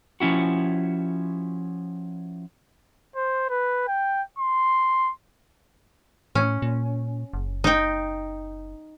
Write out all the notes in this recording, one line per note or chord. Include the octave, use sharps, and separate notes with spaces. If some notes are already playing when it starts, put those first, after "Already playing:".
F3 C#4 E4 F#4
C5
B4
G5
C6
A2 C#4
A#2
F#1
D#4 G5